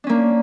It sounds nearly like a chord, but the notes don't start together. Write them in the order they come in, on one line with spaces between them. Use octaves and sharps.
D4 C#4 A#3